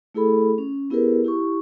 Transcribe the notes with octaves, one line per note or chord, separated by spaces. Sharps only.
A3 E4 G#4 A4 B5
C#4
B3 E4 G4 G#4 A#4 B4
E4 G4 C#6